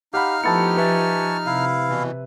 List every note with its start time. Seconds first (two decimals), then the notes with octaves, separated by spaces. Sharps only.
0.14 D#4 G4 F5 F#5 B5 F6
0.44 F3 A3 B3 E4 G4 A5 A6 C#7
0.77 B4 E5 G#5 A5 C#6
1.46 C3 E4 F5
1.89 B2 E3